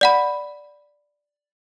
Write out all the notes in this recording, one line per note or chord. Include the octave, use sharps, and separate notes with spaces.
D5 F#5 B5